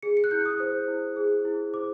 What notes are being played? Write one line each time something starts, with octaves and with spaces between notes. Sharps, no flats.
G#4 C#7
C#7
F#6
E4 G6
D#6
C5
E4
G#4
E4
C5 D6